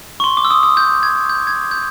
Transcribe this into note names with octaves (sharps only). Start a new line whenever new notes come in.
C#6
C6
D6
E6
D#6
D#6
G6
G#6
G6
G#6
G6